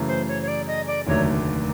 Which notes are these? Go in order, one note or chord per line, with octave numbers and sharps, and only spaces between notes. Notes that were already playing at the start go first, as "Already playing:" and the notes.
Already playing: F#2 C#3 E3 A3
C5
C#5
C#5
D5
D#5
D5
F1 D#2 D3 F#3 A3 C#5